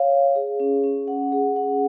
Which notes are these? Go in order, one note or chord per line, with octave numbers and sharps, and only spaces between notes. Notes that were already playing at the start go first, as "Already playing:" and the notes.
Already playing: C#5 F5
F5
G#4
C#4
C#4
F#5
G#4
F#5